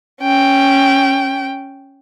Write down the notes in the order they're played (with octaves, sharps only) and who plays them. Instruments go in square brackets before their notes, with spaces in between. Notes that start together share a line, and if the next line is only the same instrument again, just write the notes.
[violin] C#4 G5